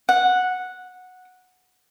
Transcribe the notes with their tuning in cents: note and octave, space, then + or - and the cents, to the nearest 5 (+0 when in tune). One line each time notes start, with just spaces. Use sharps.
F#5 -10